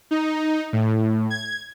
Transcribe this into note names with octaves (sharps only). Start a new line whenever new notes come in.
D#4
A2
G#6